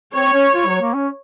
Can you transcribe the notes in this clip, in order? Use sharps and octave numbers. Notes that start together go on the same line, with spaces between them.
C4 C#5
C#4
F4
F#3
A#3
C#4